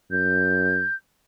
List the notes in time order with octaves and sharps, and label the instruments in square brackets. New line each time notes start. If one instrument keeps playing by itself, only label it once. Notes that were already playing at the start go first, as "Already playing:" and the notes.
[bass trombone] F#2 [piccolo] G6